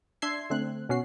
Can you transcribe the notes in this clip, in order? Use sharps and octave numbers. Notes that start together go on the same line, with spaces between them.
D4 E5 C6 G#6 C7
D3 A3 C4 F#6
B2 C#4 F#4 C7